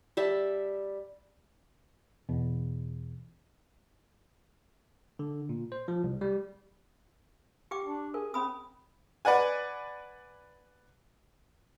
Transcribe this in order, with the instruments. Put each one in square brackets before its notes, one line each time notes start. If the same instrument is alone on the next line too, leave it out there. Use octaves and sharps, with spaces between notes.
[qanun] G3 E5 A5
[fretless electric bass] E2 B2
[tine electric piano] D3
A#2
C5
F3
C2
G3
[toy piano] G4 G5 D6
[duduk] D4
[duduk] G#4 [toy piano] A#4
[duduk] C4 [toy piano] C#4 B5 D#6
[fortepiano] B4 D5 F#5 G#5